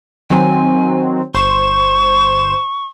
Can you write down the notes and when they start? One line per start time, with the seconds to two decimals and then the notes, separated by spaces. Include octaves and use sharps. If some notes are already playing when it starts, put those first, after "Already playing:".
0.30 D#3 F#3 C4 G#5
1.34 G1 C5 C#6 E7